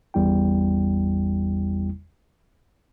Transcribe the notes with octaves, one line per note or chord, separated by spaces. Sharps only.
G#1 E2 G3 E4 G5